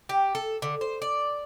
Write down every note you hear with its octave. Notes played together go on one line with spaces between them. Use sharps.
G4
A4
D3
C5
D5